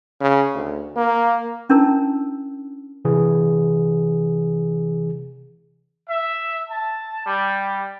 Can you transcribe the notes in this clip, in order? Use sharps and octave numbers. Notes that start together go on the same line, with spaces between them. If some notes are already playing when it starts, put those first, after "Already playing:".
C#3
D2
A#3
C#4 D4 E4 A#4 A5 E6
C3 E3 G#4
E5
A5
G3